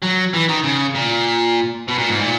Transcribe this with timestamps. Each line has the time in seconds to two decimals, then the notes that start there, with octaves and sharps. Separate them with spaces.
0.02 F#3
0.33 E3
0.49 D#3
0.64 C#3
0.95 A#2
1.88 B2
1.98 A#2
2.09 G#2
2.19 A#2